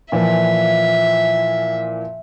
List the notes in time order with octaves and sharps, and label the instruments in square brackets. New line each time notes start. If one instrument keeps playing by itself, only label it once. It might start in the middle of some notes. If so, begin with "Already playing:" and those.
[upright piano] A#2 E3 F3 [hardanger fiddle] E5